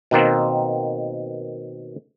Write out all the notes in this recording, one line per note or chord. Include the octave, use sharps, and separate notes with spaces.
B2 D#3 A#3 C4